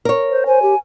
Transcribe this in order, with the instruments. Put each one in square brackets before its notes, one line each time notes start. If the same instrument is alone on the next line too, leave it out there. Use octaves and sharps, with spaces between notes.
[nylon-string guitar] A#4 C#5
[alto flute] C5
[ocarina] C5 [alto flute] G#5
[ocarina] G4